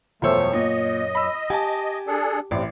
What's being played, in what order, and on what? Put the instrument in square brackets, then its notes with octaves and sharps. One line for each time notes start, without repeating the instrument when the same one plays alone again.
[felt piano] E1 C5 E6 [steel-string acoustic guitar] F#2 C#5 [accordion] F3 A3
[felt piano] A#2 [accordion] D#5
[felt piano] B5 E6
[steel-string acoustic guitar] G4 [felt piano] G#5 A5
[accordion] D4 G#4 A4
[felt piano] A1 [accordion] C3 [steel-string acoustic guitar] D5